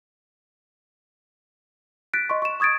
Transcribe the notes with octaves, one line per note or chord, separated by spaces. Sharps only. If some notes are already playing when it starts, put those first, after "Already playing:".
F#6 A6 B6 D7
D#5 C6 C#6
C#6 E7
C#6 D#6 G#6 A6 D7